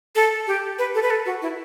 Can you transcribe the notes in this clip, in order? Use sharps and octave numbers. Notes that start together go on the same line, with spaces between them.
A4
G4
B4
A4
B4
A4
F#4
E4